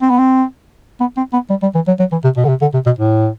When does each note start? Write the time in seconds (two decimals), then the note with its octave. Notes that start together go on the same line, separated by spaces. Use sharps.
0.02 C4
0.10 B3
0.19 C4
1.00 B3
1.17 C4
1.33 B3
1.50 G3
1.63 G3
1.75 E3
1.88 F#3
2.00 F#3
2.12 E3
2.24 C3
2.37 B2
2.45 D3
2.49 C3
2.62 D3
2.74 C3
2.86 B2
2.99 A2